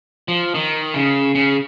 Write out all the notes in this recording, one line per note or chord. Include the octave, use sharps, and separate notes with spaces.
F3
D#3
C#3
C#3